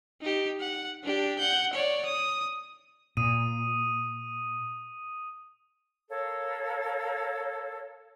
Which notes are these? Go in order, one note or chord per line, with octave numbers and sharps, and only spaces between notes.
D#4 G4
F#5
D4 G4
F#5 G6
C#5 D5
D#6
A#2 D#6 D#7
A4 A#4 C#5 F5